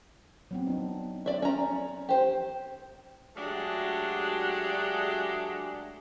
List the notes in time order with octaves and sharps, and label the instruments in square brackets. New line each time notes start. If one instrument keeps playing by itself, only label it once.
[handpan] F#3 B3 C4
D4 D#4
[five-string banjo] D5 E5
C#4 A#5
G4 C5
[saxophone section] F#3 G#3 A3 D4 F#4 G4